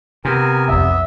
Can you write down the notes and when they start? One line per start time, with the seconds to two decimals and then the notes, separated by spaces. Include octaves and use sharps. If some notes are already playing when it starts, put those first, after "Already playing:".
0.25 C3 B3 A#4 G#5
0.69 B1 F2 B3 E5